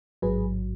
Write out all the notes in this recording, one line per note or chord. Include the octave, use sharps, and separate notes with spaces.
A1 G#2 F#3 G#4 B4